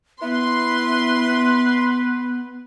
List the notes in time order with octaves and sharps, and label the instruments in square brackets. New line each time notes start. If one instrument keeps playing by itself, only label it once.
[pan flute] B3 [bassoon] E4 [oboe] B4 [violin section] C6